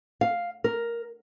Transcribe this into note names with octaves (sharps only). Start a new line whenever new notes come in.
F5
A#4